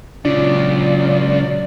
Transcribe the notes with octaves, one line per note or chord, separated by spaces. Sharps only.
C#2 A#2 C#3 F#3 D4 F4 D5